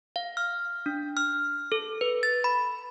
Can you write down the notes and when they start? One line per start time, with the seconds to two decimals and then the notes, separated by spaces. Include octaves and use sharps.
0.16 F5
0.37 F6
0.86 D4
1.17 F6
1.72 A4
2.01 B4
2.23 A6
2.44 B5